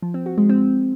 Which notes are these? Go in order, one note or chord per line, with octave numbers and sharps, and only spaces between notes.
F3
C4
F#4
G#3
C4